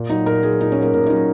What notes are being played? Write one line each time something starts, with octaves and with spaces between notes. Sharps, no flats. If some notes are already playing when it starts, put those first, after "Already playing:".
Already playing: A#2
F#3 D#4
A#2 A#4
F#3 G#4
A#2 D#4
C#4
F#3
A#3
A#2 A#3
D#4
F#3 C#4